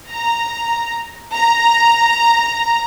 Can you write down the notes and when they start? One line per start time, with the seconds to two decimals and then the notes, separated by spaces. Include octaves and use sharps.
0.11 A#5
1.35 A#5